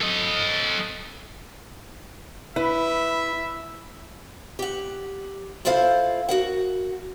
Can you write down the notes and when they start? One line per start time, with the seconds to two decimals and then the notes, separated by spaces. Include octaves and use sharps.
0.01 A4 D#5
2.56 E4 B4 E5
4.59 G4 F#5
5.65 E4 F4 A4 C5 F5
6.29 F#4 A#4 F#5